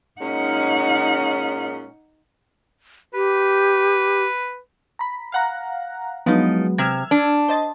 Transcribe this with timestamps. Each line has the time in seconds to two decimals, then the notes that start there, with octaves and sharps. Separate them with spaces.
0.20 A#2 G#3 C#4 D#4 F#5
3.14 G4 B4
4.99 A#5 B5
5.32 F5 F#5 A#5
6.26 F3 F#3 G#3 B3 D#4
6.78 C3 E6 F6 G#6
7.11 D4
7.48 C5 D#5 A6